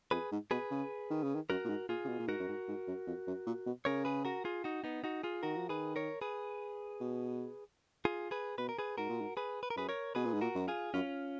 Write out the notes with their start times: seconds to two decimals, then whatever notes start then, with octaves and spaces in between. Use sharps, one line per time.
0.11 F2 G#4 B4
0.32 G#2
0.51 B2 G#4 B4
0.71 C#3
1.10 D#3
1.23 C#3
1.35 D#3
1.49 F#2 F#4 A#4
1.64 A#2
1.69 G#2
1.89 A#2 F4 G#4
2.04 C#3
2.09 B2
2.19 A#2
2.28 G#2 F#4 A#4
2.39 F#2
2.48 G#2
2.68 G#2
2.87 F#2
3.07 F2
3.27 F#2
3.46 A#2
3.66 B2
3.85 C#3 A#4 C#5
4.05 G#4 B4
4.25 F#4 A#4
4.45 F4 G#4
4.64 D#4 F#4
4.84 B3 D#4
5.04 D#4 F#4
5.23 F4 G#4
5.43 D#3 F#4 A#4
5.56 F3
5.69 D#3 G#4 B4
5.96 A#4 C#5
6.21 G#4 B4
7.01 B2
8.05 F4 G#4
8.31 G#4 B4
8.58 B2 B4
8.69 A#4
8.79 G#4 B4
8.98 G#2 F#4 A#4
9.09 A#2
9.21 G#2
9.37 G#4 B4
9.63 B4
9.70 A#4
9.76 F#2 G#4 B4
9.89 A#4 C#5
10.15 B2 G#4 B4
10.25 A#2
10.34 G#2
10.41 A#2 F#4 A#4
10.55 F#2
10.68 F4 G#4
10.94 F#2 C#4 F4